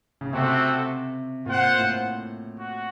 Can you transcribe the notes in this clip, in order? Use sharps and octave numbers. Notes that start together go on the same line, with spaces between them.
C#3
C3 A3 C4 F#4 A4
A#2 F4 C5 F#5
A2
F#4